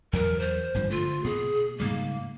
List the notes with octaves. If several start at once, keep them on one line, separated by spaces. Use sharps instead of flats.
E2 F#3 A#4
C5
G#1 G2 F3
D3 A3 F4
B2 A#3 G#4
G#2 C#3 G3 A#3